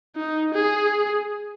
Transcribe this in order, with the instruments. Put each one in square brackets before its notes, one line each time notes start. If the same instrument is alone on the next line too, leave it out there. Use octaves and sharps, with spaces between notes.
[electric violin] D#4
G#4